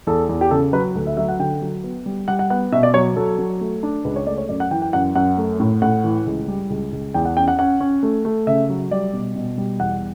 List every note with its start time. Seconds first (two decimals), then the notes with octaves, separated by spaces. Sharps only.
0.07 E2 A4
0.29 E2
0.41 G4
0.51 C#3 A4
0.73 F#3 B4
0.95 D2
1.07 E5
1.17 F#3 E5
1.29 F#5
1.39 D3 G5
1.62 F#3
1.84 B3
2.06 G3
2.28 G3 F#5
2.39 F#5
2.50 B3 F#5
2.72 B2 E5
2.83 D5
2.94 F#3 C#5
3.16 F#3 A4
3.38 F#3
3.61 A3
3.83 D4
4.05 C#2 B4
4.16 C#5
4.27 A3 D5
4.38 C#5
4.49 F#2 D5
4.60 F#5
4.71 E3 G5
4.82 G5
4.93 F#2 F#5
5.15 F#2 F#5
5.38 A3
5.60 A2
5.82 A2 F#5
6.04 E3
6.26 C#2
6.48 G3
6.70 C#2
6.92 C#2
7.14 E2 G5
7.25 F#5
7.37 C#4 G5
7.48 F#5
7.59 C#4 F#5
7.80 C#4
8.03 A3
8.25 A3
8.47 C#3 E5
8.69 F#3
8.91 G3 D5
9.13 B2
9.36 B2
9.58 G3
9.79 E2 F#5